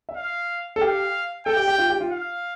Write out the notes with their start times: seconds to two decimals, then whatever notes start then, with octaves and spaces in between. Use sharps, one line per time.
0.09 E5
0.16 F5
0.76 A4
0.81 G4 F5
1.46 A4 G5
1.57 G4
1.68 G4
1.78 F4
1.90 G4
2.01 F4
2.11 F5